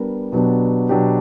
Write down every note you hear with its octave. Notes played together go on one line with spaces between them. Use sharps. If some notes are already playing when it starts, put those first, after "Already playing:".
Already playing: G3 B3 D4 A#4
B2 F#3 B3 D4 G4
B2 F#3 B3 D4 G4